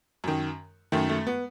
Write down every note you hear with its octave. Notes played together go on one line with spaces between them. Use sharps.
F#2 D#3
F#2 D#3 A3
A3
B3